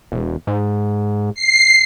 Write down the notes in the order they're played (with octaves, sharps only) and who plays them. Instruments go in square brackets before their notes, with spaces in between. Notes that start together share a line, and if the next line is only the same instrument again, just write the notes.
[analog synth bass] E1
G#2
[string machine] C7